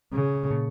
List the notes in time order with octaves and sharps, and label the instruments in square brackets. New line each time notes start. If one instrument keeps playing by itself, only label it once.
[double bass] C#3
[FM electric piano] A#2 A#3